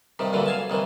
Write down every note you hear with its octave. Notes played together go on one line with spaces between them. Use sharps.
G2 C3 D#3
G2 A#2 D3 E3 F#3
F5 G#5 A5
C2 D#3 E3